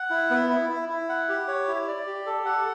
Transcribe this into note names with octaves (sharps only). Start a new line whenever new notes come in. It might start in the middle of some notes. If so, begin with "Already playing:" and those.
Already playing: F#5
E4
B3
E4
E4
E4
F#5
G4
C#5
E4
D5
G4
A4
F#5